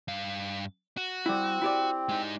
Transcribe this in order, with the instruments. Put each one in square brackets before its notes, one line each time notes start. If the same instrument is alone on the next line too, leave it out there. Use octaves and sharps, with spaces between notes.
[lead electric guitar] G2 F5
F#4
[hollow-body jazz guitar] G3 E4 [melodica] C4
[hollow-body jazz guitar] E4 G4 D5
[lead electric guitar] G#3 D#4